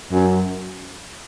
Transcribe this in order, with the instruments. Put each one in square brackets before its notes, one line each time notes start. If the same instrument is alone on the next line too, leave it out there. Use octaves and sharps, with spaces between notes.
[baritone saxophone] F#2